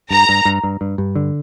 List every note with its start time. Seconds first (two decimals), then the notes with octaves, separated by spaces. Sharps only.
0.10 G2 A#5
0.29 G2
0.45 G2
0.63 G2
0.81 G2
0.98 G2
1.15 D3